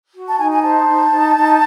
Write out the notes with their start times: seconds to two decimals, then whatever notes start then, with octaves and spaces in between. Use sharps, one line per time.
0.14 F#4
0.27 A5
0.39 D#4 G#5
0.51 G#5
0.62 C5 A5
0.87 D#4
1.12 D#4
1.36 D#4